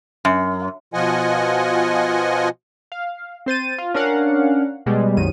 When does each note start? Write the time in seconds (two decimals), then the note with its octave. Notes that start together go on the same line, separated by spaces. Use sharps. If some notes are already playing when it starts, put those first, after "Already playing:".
0.25 F#2
0.94 B2 F3 F4 D#5 F#5 G#5
2.92 F5
3.46 C4 C5 A6 D#7
3.78 F4
3.94 C#4 D4 A#4 F5 F#5
4.86 B2 G3 G#3
5.17 C2 F#2 D#3 D#7